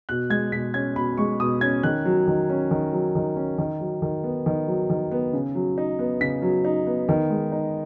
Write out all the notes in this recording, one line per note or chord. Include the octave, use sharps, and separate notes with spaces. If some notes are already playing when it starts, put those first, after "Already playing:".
B2 F#6
G#3 G#6
B2 B6
C#4 G#6
B2 B5
G#3 C#6
B2 D#6
C#4 G#6
D#3 F#6
F#3
D#3
C#4
D#3
F#3
D#3
C#4
D#3
F#3
D#3
B3
D#3
F#3
D#3
B3
C#3
F#3
D#4
B3
C#3 B6
F#3
D#4
B3
D#3
G#3
D#4